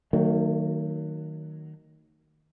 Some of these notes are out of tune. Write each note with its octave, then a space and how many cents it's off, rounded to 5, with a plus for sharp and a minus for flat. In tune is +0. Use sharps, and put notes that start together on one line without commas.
D#3 +0 F#3 +5 A3 +45